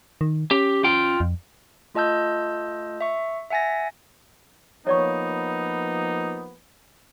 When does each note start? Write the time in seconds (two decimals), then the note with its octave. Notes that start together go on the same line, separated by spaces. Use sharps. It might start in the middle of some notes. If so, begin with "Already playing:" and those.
0.21 D#3
0.51 C#4 G4
0.84 F4 G5
1.20 F2
1.94 A3 F4 D#5 A5 E6 G6
3.01 E5 C#6
3.50 E5 F#5 G#5 A6 A#6
4.87 F3 A#3 B3 D#4 C#5 D5 C#6